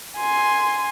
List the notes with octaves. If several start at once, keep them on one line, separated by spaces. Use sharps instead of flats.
G#5 C6